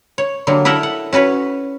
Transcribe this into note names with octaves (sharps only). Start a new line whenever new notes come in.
C#5
D3 F#3 G3 A#3
E4 A4 A#4 F#5
F#5
C#4 F#4 B4 C#5